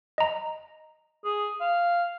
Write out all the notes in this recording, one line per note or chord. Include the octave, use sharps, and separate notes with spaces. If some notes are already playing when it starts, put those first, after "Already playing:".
D#5 A#5
G#4
F5